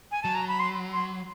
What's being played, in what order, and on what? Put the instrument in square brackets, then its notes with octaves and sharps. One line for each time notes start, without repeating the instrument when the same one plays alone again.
[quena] G#5
[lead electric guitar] F#3 [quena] A5
[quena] A#5
B5
C6
C6